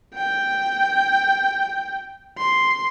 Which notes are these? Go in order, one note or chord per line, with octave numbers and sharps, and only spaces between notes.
G5
C6